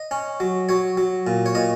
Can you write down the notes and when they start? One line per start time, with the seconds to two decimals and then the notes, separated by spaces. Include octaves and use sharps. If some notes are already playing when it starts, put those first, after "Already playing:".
Already playing: D#5
0.11 C#4
0.40 F#3
0.69 F#3 C#5
0.97 F#3
1.27 A#2
1.46 C#5
1.55 A#2 D#5